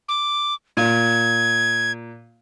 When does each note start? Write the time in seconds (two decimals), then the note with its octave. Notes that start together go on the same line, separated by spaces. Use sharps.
0.09 D6
0.77 A#2 G#6